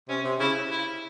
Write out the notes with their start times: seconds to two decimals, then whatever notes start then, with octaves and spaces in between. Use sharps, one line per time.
0.08 C3 C#4
0.24 C3
0.40 C#3 E4
0.71 E4